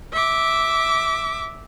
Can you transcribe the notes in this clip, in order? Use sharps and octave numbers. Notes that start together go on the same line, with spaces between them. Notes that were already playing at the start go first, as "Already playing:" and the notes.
E5 D6